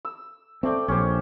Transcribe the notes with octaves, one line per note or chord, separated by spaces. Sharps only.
E6
A3 C4 D5 G5
A#1 C#4 G4 C5